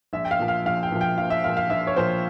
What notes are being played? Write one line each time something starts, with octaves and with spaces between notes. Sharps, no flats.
A#1 E5
G5
F5
A#2 F3
F5
A#1 F5
G5
A#2 F3
G5
A#1 F5
E5
A#2 F3 F5
F5
A#1 E5
C#5
A#2 F3 C5